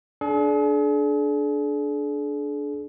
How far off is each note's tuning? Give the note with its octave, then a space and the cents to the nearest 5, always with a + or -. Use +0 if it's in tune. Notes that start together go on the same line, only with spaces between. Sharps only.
D4 -5 G#4 +45